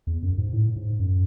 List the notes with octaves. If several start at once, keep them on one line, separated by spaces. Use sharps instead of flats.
E2
F#2
G#2
A2
G#2
F#2